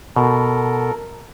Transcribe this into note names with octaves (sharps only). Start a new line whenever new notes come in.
B2 A4 A#4